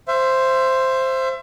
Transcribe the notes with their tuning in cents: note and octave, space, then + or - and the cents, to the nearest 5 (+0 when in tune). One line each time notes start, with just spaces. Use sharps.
C5 +0 E5 +30